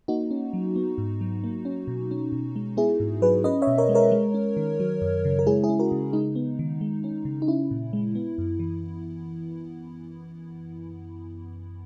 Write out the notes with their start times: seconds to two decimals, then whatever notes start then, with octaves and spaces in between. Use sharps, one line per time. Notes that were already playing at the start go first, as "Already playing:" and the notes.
0.08 A#3 D#4 F#4
0.31 C#4
0.53 F#3
0.76 B3
0.98 G#2
1.21 F#3
1.44 A#3
1.65 C#4
1.88 B2
2.11 C#4
2.32 B2
2.56 G#3
2.77 B3 E4 G#4
3.00 G#2
3.22 F#3 G#4 B4
3.44 C#4 B4 D#5
3.62 C#5 E5
3.67 B2
3.78 A#4 C#5
3.89 G#3
3.95 A#4 C#5
4.11 G#3
4.34 C#4
4.57 D#3
4.80 F#3
5.02 F#2
5.25 C#3
5.39 A#4
5.46 G#3 E4 G#4
5.64 E4 G#4
5.69 C#4
5.79 F#4 A#4
5.92 C#3
6.13 G#3 D#4
6.35 B3
6.59 D#3
6.81 G#3
7.04 C#4
7.25 C#3
7.42 D#4
7.47 C#4 E4
7.71 A#2
7.93 G#3
8.15 B3
8.38 F#2
8.59 E3